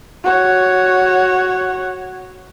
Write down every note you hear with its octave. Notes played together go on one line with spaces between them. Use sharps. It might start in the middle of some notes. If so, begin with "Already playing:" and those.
F#4 C#5